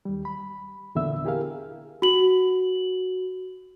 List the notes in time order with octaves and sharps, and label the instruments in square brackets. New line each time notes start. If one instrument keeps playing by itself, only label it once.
[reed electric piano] D#2 G3
B5
E2 A#2 D3 B3 E5 E6
E4 G4 G#4 A#4 F5
[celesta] F#4 F#7